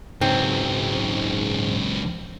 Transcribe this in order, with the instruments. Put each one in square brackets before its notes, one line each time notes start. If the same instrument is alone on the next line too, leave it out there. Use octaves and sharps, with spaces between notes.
[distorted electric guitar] C#2 F#3 [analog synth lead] G#2 [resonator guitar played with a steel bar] C4